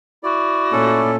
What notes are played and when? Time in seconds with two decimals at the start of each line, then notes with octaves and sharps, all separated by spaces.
0.23 E4 F#4 D5
0.72 A#2 A3 C#4 A4